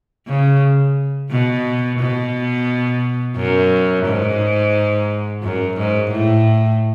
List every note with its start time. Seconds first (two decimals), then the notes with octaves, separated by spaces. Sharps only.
0.27 C#3
1.30 B2
1.99 B2
3.37 F#2
4.06 G#2
5.43 F#2
5.77 G#2
6.11 A2